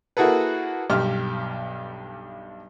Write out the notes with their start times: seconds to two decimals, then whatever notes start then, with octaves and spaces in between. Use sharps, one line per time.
0.17 A#3 E4 F#4 G#4 A4 B4
0.90 B1 G2 G4 F6